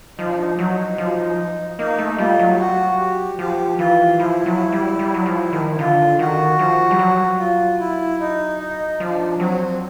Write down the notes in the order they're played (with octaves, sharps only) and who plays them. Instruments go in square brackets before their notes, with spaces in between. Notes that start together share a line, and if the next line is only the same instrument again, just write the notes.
[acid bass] F3 [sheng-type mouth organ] D#4
[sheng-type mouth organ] D4
D#4
[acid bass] F#3
F3
[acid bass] A#3 [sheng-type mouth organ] D#4
[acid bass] A3
[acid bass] G3 [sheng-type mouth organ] F4
[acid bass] F#3
[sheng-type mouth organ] G4
F#4
G4
[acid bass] F3 [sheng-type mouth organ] G4
[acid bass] E3 [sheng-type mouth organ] F4
[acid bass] F3 [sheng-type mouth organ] E4
[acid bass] F#3
G3
G3
F#3
F3
D#3
[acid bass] D3 [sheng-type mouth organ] F4
[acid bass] D#3 [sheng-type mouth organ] F#4
[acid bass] F3
G3
F#3
[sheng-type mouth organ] F4
E4
D#4
D#4
[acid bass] F3 [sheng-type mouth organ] D4
[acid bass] F#3 [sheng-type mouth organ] C4